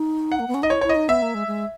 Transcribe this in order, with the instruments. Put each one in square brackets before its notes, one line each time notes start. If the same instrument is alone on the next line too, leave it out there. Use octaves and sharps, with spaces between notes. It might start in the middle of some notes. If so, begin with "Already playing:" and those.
Already playing: [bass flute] D#4
[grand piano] F#5
[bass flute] A#3
B3
C#4
[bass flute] D#4 [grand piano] D#5
[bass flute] E4 [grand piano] C#5
[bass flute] E4 [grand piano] C#5
[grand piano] D#5
[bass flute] D#4
[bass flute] B3 [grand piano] E5
[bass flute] A#3
G#3
G#3